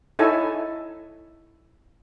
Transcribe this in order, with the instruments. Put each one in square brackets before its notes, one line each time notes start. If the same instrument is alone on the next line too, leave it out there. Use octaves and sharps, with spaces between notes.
[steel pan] D#4 E4 A4 C#5 G#5